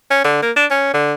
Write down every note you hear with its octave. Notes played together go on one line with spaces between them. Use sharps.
C#4
D3
A#3
D4
C#4
D3